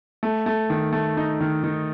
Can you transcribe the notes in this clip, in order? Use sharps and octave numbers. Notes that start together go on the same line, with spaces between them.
A3
A3
D#3
A3
D#4
D#3
D#3